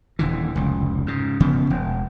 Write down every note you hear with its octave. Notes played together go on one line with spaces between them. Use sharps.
D#1 D3 E3
F1 C#2
G#2 C#3
G1 C#3 F3 B3
E1